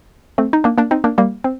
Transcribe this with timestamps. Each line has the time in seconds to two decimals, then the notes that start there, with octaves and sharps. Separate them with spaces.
0.38 A3 C4
0.53 D#4
0.64 A#3 D4
0.78 A#3 D4
0.91 C4 D#4
1.04 A#3 D4
1.18 G3 A#3
1.44 C4